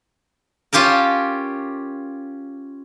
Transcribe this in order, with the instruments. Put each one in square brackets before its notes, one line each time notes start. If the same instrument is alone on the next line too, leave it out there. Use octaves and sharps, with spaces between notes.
[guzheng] C#4 F4 G4 A4 A#4